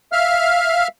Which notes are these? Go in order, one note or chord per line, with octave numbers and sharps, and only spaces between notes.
E5 F5 F6